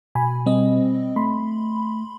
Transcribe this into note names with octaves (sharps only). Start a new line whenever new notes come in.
B2 G#5 B5
G3 C4 D#5
A3 B5 C6